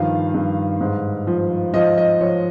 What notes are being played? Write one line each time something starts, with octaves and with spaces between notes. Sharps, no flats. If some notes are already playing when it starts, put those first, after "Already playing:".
Already playing: G2 D#3 F3 F5
G2
G#2
F3
F3 D#5
D#5
F3 C#5